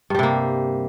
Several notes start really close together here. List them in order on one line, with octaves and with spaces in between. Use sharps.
G2 G3 C3 A#3